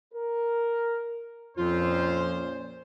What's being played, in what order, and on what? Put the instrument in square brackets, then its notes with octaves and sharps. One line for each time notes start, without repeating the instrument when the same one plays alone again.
[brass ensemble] A#4
[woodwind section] F2 F3 F4 [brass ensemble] A#2 C#4 C5